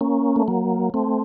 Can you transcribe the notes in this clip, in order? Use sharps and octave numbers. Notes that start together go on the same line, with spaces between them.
A#3 C#4
A3
F#3 A#3
A3 C4